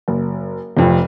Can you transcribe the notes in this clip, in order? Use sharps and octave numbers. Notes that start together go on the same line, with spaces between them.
F#1
F1 F2